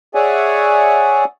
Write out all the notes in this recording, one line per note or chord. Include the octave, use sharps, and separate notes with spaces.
G#4 C#5 D5 E5 F#5 G#5